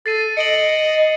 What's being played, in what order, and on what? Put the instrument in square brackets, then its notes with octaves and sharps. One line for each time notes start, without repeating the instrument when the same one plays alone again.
[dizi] A4 [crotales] A6 C7 D#7
[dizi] D#5 [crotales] C#7 D7 F#7